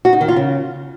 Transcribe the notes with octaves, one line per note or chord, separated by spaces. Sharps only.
F#4
D#4
D#3
F4
C#3